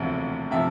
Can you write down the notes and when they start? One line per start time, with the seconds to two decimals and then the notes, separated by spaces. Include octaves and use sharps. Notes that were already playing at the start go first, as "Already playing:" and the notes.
Already playing: E1 D2 C3 F3
0.51 C3 F3 E5